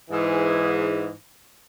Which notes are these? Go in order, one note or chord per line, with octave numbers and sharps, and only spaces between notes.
G#2 E3 G#4